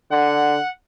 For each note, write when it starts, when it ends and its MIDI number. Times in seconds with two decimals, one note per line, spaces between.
0.12 0.58 50
0.12 0.69 78